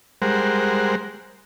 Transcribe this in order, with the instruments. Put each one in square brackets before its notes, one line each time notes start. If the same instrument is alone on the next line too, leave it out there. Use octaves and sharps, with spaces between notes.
[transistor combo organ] G3 G#3 A#4 C5 F#5